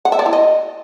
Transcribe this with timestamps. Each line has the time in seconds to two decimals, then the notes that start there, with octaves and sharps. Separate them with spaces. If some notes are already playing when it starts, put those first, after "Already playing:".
0.05 F#5
0.12 E5
0.19 D5
0.26 E4
0.33 D#5